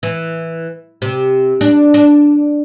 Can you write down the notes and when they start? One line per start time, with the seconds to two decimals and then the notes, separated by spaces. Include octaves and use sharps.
0.03 E3
1.02 C3
1.61 D4
1.94 D4